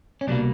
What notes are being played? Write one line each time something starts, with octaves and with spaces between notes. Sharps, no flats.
C#4
C2 B2 G3 A#3 D4